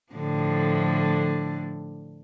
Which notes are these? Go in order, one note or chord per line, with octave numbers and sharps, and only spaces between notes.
A2 D3 F3